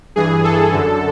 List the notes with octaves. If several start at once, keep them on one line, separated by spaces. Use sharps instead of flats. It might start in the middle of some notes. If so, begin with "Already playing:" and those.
G2 E3 G#4
A4
F#2 D3